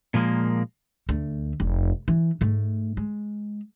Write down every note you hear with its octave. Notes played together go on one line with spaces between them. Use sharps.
A#2 F3 G#3 A#3
D2 A3
F1
E3
G#2 A3
G#3